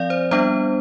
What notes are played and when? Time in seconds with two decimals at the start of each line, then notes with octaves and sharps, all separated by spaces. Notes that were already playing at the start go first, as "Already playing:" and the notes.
Already playing: F3 C4 D5 F5
0.10 C5
0.31 G3 B3 D4 C5